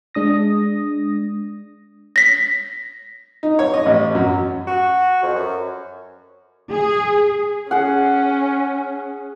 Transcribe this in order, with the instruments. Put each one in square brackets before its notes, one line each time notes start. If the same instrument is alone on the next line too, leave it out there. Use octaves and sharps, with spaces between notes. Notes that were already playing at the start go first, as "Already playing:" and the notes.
[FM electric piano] G#3 D4 D#6 A#6
[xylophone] A#6 B6
[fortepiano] D#4
C#5
D#5
A1
F#2
[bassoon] F#4
F2
F#2
[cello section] G#4
[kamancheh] C#4 [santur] G#4 F#5